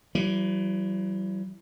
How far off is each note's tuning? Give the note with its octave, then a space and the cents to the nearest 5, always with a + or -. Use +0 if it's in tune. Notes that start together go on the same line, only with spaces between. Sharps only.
E3 +25 G3 -45